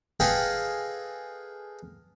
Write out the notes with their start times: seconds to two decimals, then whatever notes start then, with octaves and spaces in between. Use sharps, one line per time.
0.20 G#4 A4 B4 D#5 F5 G5